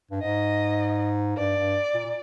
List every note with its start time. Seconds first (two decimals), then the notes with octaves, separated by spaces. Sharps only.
0.11 G2
0.22 G#2 D#5
1.37 G2 D5
1.56 G2
1.94 A#2
2.05 A#2